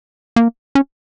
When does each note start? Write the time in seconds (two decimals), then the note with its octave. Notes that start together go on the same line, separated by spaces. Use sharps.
0.36 A#3
0.75 C#4